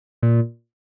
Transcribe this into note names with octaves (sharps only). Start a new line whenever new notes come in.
A#2